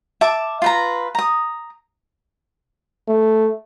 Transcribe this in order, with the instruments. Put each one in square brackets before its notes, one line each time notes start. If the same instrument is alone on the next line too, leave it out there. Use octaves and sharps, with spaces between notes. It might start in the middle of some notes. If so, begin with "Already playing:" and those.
[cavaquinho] E5 A5 D6
F4 B4 A#5
A#5 D#6
[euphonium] A3